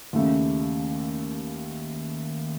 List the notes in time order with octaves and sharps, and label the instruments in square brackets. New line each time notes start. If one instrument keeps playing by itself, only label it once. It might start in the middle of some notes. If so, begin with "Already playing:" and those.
[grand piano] D#2 C#3 A3